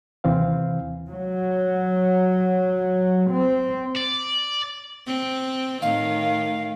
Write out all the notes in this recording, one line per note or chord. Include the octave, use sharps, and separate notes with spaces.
D#2 C3 E3 C4 F5
F#3
C4
D5
C4
A2 D#3 F5